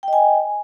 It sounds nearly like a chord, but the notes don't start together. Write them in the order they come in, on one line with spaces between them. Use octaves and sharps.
G5 D#5 G#5